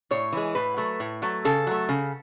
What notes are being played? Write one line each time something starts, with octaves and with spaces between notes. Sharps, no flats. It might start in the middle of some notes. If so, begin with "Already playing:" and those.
A2 C#5
E3 G#3
A2 B4
F#3 A3
A2
F#3 A3
C#3 A4
F#3 A3
C#3